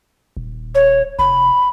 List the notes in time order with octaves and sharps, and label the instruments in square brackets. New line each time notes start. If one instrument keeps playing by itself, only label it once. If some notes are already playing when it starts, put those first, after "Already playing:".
[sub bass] D#1
[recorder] C#5
[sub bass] F1 [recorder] B5